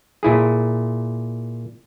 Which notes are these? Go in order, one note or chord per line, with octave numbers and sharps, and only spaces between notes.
A#2 E4 G#4